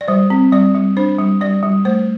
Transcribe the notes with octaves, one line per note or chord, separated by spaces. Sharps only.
D5
G3 C5
C4
G3 D5
G3
D4 C5
G3
G3 D5
G3
A3 C5